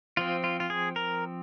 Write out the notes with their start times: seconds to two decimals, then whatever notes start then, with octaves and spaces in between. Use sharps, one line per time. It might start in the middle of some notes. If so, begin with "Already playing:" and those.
0.17 F3 C4 F4
0.44 F4
0.60 F4
0.70 G#4
0.96 A#4